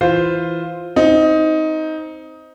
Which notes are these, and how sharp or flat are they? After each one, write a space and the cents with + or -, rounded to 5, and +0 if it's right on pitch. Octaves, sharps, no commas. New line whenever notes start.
E3 +0 F4 +5 C5 +0
C4 +0 D#4 +15